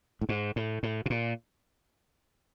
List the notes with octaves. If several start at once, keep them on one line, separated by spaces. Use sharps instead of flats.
A2
G#2
A2
A2
B2
A#2